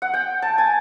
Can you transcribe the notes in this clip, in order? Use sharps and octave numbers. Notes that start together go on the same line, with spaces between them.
F#5
G5
A5
G#5